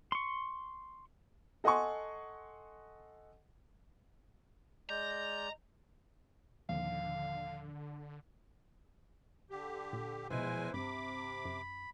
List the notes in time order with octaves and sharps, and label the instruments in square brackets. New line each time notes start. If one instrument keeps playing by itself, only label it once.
[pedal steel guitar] C6 C#6
[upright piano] A4 D#5 F#5 G#5 C6 C#6
[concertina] G#3 D5 [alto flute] D#5 [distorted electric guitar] A#5 [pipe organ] G6
[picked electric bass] D#1 D#2 F3 [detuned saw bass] D3 [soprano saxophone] F5
[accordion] D3 G4
[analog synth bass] A#2
[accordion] E2 G#3 G#5 [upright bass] B2 F3 [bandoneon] E4 B4 C5
[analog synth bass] G2 [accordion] C3 D6 [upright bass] C4 [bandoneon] B5
[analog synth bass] F#2